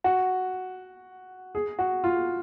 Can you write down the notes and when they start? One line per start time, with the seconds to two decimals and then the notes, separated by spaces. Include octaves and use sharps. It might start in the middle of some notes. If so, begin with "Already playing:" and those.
0.04 F#4
1.55 G#4
1.79 F#4
2.04 F4